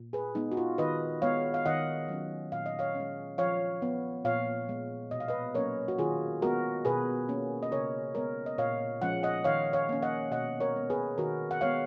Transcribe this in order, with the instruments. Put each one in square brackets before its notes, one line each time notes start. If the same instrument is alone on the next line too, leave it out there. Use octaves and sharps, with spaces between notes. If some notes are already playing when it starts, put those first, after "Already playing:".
Already playing: [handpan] A#2
G#4 B4
G#3 B3 D#4
F#4
F4
D#3 B4 D#5
G#3 B3 C#5 F5
F5
D#3 D#5 F#5
F#3 C#4
A#2 F5
D#5
C#5 F5
G#3 C#4
F3 C#5 F5
B3
A#2 C#5 F5
G#3 B3
B2 D#5
F5
B4 D#5
F#3 A#3 C#4 A#4 C#5
F#4
D#3 F4 G#4
G#3 B3 F#4 A#4
B2 G#4 B4
A#3 C#4
D#5
C#3 A#4 C#5
G#3 B3 A#4 C#5
D#5
A#2 C#5 F5
F3 G#3 C#4 F#5
D#5 F#5
D#3 C#5 F5
C#5 F5
A#3 C#4
D#5 F#5
B2 D#5 F#5
A#4 C#5
G#3 B3
G#4 B4
D#3 F#4 A#4
F#5
G#3 B3 C#5 F5